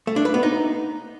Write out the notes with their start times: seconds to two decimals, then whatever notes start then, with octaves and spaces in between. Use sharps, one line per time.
0.07 A3
0.16 D4
0.25 B4
0.34 B3
0.43 D#4